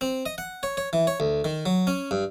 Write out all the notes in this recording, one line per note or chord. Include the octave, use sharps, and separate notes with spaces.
C4
D#5
F#5
C#5
C#5
E3
C#5
D2
D#3
F#3
C#4
G2